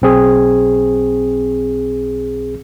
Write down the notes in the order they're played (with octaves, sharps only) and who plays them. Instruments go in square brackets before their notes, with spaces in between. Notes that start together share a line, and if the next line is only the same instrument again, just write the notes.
[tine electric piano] B1 C4 G#4